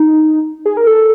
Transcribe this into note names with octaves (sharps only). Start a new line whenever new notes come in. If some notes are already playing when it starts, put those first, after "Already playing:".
Already playing: D#4
G#4
A#4
A4